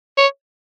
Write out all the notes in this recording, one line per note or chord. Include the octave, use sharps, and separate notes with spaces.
C#5